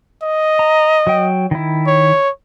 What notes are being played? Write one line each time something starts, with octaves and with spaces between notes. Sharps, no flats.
D#5
A#5
F#3 G5
D#3 E4
C#5